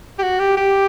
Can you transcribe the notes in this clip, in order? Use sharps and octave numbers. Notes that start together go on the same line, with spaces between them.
G4
F#4
G4
G4